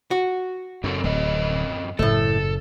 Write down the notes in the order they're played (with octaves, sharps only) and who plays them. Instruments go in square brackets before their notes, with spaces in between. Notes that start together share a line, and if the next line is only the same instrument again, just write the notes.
[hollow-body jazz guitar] F#4
[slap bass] F#2 [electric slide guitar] C#3 C4 A4
[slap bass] D1 [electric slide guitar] F#2 C4 D#5
[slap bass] F#1 [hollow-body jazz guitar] A2 A3 [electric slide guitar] A4